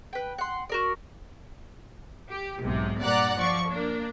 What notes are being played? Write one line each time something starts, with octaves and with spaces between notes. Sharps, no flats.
B4 G5
F#5 C6
F#4 A#4 D5
G4
B1 G#2 C3
G2 A#2 D5 F#5 A#5 F#6
F3 D5 C#6
A#3 D4